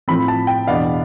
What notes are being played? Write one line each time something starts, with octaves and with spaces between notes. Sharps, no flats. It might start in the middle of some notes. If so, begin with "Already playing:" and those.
A2 F3 C4 B5
A5
G5
E2 B2 B3 D4 F5